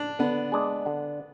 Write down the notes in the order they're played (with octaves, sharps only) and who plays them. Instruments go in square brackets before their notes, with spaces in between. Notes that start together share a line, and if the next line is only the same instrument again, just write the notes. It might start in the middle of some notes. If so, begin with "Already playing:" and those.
Already playing: [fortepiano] D4
[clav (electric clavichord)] D3 [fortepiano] B3
[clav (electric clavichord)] G#3 D4 G#4
D3